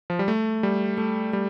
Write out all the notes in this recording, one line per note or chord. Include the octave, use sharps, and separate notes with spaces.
F3
G3
A3
G3
A3
G3